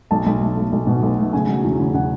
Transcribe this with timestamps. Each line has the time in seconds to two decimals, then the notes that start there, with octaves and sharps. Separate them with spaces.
0.11 B1 A5
0.26 B1
0.41 A3
0.57 B1
0.72 B1
0.87 B2
1.03 B1
1.18 A3
1.33 C#3 G#5
1.48 F#3
1.64 E2
1.80 C#3
1.94 C#3 F#5